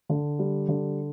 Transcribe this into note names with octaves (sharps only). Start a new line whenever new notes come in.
D3
G3
D3